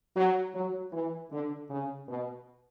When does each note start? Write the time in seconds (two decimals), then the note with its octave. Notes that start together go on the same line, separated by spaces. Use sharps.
0.16 F#3
0.55 F#3
0.93 E3
1.31 D3
1.70 C#3
2.09 B2